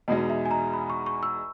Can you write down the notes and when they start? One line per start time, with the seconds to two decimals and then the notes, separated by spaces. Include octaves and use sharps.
0.08 E2 B2 G#3 D#4 D#5
0.30 E5
0.46 G#5
0.51 A#5
0.74 B5
0.90 C#6
1.06 C#6
1.23 E6